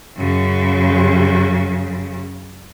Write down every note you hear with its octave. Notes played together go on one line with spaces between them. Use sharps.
F#2 C#3